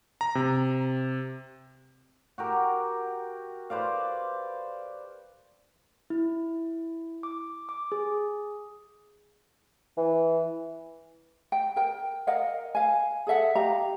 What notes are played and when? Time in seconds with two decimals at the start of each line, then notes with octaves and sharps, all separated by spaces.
0.21 A#5
0.35 C3
2.38 F#4 G4 A#4
3.70 B4 C5 D5 F5
6.10 E4
7.23 D6
7.69 D6
7.92 G#4
9.97 E3
11.52 G5
11.76 A#4 G5
12.27 A#4 D#5 F5 F#5
12.75 F5 G#5
13.27 G#4 A4 E5 F#5
13.55 G4 F5 A#5